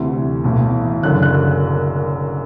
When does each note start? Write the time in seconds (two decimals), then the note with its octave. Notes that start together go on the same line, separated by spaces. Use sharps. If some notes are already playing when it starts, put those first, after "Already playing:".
Already playing: D2 C3 E3
0.44 B1 A2 E3
1.03 F#1 F#2 D3 F#6
1.23 F#6